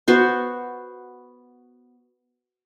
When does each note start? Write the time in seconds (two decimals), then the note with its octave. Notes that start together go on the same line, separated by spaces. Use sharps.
0.08 B3 F#4 C5